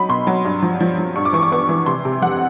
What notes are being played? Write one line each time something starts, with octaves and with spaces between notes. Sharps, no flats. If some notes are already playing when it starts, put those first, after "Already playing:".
Already playing: F#3 D#4 B5
B2 C6
F#3
G2
F3
F3
F3
G2 C#6
D6
E3 C#6
D6
B3 C#6
E3
C3 C6
C3
F2 F#5